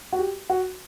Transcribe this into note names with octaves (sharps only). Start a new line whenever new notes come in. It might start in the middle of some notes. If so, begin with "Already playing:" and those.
F#4
G4
F#4